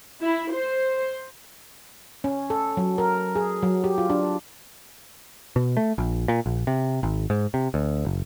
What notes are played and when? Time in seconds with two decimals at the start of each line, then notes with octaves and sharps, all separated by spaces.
0.20 E4
0.52 C5
2.24 C#4
2.50 A4
2.77 F#3
2.98 A#4
3.36 G#4
3.62 F#3
3.84 G4
3.98 F4
4.10 D4
5.56 B2
5.77 A3
5.98 A#1
6.28 A#2
6.46 A#1
6.67 C3
7.03 G#1
7.30 G#2
7.54 C3
7.74 D2
8.05 F#1